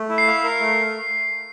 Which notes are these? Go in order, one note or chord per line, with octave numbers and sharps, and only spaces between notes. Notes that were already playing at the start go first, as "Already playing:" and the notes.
Already playing: A3
E4
C7
F5
A#4
A3